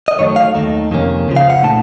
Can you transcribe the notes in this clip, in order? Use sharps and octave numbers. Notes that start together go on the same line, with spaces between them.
D#5
F#2 D#3 F#3 A3 C#5
F5
D#2 D#3 A3 D#4
F2 C3 D#3 A#3 C#4
C#2 C#3 F3
F5
F#5
A#2 A3 D#4 A5